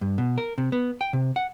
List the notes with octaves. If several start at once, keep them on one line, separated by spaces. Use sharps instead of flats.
G2
B2
A#4
C3
B3
G5
C3
F#5